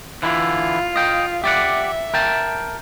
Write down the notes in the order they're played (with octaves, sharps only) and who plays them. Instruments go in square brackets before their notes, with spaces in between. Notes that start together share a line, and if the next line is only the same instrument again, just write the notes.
[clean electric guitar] D3 E3 E4 [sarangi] F4
[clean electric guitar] D#5 G5
[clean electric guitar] G4 D5 F#5 [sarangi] E5
[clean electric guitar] A#4 G5 A5